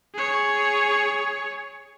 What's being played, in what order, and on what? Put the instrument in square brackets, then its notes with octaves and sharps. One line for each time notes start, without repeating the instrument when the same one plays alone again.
[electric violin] G#4 C#5